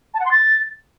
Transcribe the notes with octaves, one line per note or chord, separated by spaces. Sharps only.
A5
F#5
C6
A6